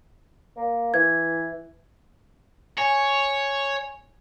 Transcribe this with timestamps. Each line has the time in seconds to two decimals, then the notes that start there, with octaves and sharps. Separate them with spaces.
0.57 A#3
0.94 E3 G#6
2.78 C#5 G#5